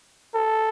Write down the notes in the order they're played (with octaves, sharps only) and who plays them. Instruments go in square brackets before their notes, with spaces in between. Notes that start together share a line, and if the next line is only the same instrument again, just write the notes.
[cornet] A4